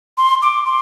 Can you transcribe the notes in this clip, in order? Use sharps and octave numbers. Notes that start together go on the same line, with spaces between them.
C6
D6
C6